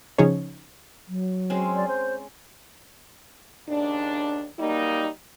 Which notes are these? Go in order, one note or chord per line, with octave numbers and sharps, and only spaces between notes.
C#3 F3 C#4 D#4 G#4 C#5
F#3
G#3 C4 C#4
D5
C5
D#2 C#3 D4
F#3 G3 A#3 D#4